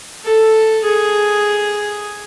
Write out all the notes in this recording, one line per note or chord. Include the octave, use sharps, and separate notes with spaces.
A4
G#4